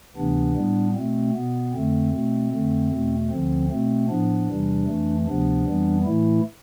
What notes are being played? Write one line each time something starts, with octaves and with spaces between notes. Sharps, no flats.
D2 C3 E3 B3 D4
A2 G3 B3
B2 A3 C4
B2 B3
F2 D3 A3 C4
B2 A3
F2 D3 A3
E2 B2 A3
D2 D3 F3 C4
B2 A3 C4
A2 F3 B3 D4
E2 C3 E3 G3
F2 E3 A3
D2 C3 F3 B3 D4
F2 E3 G3 B3
A2 E3 A3 E4